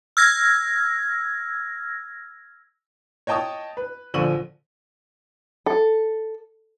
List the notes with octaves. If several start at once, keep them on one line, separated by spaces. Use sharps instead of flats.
E6 F6 G#6 A#6
C#5 D#5 G5 A5 C#6 D#6
B4
A#1 D3 F3 C#6 D#7 F#7
A4